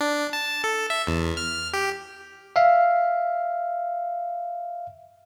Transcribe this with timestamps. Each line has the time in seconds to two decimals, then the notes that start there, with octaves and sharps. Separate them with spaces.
0.01 D4
0.33 A5
0.64 A4
0.90 E5
1.07 E2
1.37 F6
1.73 G4
2.56 E5 F5